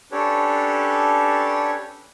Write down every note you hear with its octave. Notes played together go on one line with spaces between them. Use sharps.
C#4 D4 G4 A4 B4 C#5